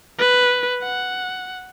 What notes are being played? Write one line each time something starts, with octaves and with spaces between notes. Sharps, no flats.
B4
F#5